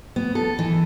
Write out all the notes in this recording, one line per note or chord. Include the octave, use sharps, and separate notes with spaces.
B3
A4
E3